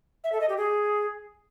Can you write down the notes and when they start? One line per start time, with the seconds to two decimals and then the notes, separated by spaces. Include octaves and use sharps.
0.24 E5
0.32 A4
0.41 D#5
0.49 G4
0.57 G#4